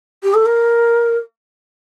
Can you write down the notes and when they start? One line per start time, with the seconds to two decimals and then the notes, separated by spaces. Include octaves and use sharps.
0.23 G4
0.34 A4
0.46 A#4